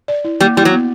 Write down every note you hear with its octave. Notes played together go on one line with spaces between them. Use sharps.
D5
E4
G3 A#3
G3 E4
F#3
B3